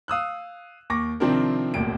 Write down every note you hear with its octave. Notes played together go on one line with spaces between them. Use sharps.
F5 D#6 E6 F#6
D#2 C#6 D6 A#6
C3 D#3 F3 C4 D4 A#4
E1 A1 D#2 D7